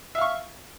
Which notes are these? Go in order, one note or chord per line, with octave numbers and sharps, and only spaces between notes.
E5 F5 C#6